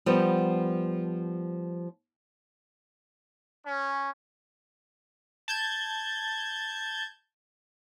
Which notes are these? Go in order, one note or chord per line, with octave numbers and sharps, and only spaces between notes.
F3 G3 B3
C#4
A5 G6 G#6